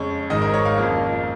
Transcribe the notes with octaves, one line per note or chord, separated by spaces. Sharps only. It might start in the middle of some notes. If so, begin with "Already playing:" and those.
Already playing: F2 C#3 G#3 C#5
G#1 G#2 D#3 G#3 D#5
A#4
C#5
F5
F2 C#3 F3 A#3